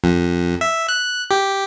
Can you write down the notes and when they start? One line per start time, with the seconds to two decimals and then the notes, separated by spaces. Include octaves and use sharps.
0.04 F2
0.61 E5
0.89 F#6
1.31 G4